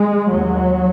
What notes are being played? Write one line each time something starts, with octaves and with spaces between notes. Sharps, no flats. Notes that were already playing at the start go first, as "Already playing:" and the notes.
Already playing: G#3
D#2 F#3